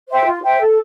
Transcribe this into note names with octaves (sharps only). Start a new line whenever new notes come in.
C5 E5 G5
F4
C5 E5 G5
A4